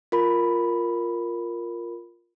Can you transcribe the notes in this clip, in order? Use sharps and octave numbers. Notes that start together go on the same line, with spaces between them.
F4 A#4 B5